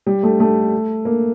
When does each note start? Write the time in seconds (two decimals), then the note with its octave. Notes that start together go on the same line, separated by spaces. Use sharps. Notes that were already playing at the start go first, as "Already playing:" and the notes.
0.06 G3
0.23 A3
0.40 A3
1.05 A#3